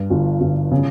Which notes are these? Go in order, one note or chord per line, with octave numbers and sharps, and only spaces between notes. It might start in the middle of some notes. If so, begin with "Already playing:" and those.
Already playing: G2
G1
G1
C#3